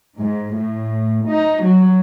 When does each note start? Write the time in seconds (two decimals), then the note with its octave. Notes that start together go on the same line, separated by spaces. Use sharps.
0.17 G#2
0.56 A2
1.26 D#4
1.64 F#3